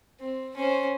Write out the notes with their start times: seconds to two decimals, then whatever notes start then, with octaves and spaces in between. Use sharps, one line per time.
0.20 C4
0.56 C#4 C5